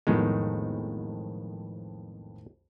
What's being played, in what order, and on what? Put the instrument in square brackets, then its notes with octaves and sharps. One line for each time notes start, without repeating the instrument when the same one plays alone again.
[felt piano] B1 F2 B3 [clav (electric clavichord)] A2 D#3 G#3